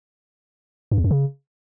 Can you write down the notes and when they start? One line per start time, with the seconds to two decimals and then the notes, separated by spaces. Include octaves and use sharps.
0.91 G2
0.98 E2
1.04 F#2
1.11 C#3